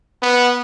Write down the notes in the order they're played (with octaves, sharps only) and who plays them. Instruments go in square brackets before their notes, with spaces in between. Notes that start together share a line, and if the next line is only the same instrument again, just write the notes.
[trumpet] B3